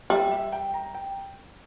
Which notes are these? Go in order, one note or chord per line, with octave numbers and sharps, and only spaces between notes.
G3 E5
E5
G5
A#5
G5